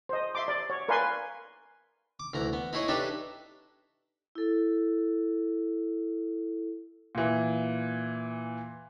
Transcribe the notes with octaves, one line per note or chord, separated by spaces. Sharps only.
C5 D#5
E5 C6 D6
D5
C#5
A#4 B4 D5 F5 G#5 C6
D6
D2 E3 A#5
B3
D#4 E4 G#4 C#5 D#5
D4 D#4 G4 A4 B4 E5
E4 A4
A#2 E3